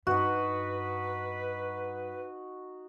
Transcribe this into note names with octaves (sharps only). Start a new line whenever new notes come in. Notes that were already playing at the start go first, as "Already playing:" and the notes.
G2 D#4 F#4 B4